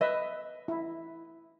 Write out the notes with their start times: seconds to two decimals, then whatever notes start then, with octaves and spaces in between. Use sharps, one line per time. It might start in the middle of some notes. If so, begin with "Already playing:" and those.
0.01 B4 D#5 E5
0.68 E4